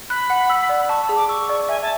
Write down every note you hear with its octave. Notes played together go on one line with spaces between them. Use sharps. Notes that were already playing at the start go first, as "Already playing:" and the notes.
B5 F#6
F#5
E6
D5
A5 C#6
E6
G#4
D6
C#6 E6
D5
E5 G#5
A5